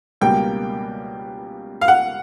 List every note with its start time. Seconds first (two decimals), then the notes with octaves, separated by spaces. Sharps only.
0.21 C#2 B2 G3 A#3 G5
1.81 F5
1.88 F#5